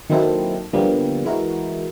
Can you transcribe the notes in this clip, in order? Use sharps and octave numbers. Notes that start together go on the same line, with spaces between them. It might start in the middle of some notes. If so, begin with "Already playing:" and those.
D#3 F#3 A#3 C4 E4 A4
D3 F3 G3 A#3 B3
E3 G#3 E4 F#4 A#4